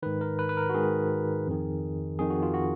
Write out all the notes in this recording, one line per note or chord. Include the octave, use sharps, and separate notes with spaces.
G#2 D#3 B4
A#4
B4
B4
A#4
F#4
G#2 D#3 G#4
F2 D#3
F2 D#3 G#4
F#4
F4
F#4